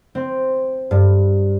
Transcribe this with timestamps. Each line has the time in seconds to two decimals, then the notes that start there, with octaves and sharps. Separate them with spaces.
0.15 C4
0.91 G2